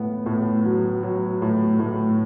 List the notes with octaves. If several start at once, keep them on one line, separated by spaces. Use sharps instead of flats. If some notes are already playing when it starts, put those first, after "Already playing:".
Already playing: A2 B3
A2
F#3
F#3
A2
A2